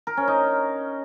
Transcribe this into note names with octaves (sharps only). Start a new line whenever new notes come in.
A#4
C#4
D#4